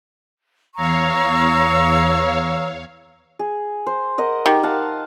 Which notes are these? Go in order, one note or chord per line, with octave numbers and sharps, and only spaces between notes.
E2 C#5 F5 A#5 C#6 E6
G#4
C5
A#4 D#5 F#5
D#3 G4
F5 F#5 A5